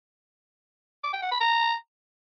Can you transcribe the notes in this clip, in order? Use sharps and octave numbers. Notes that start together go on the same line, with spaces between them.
D6
G5
F#5
B5
A#5